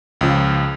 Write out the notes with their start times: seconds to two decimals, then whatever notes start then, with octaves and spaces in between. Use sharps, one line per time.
0.21 C#2 C#3 F3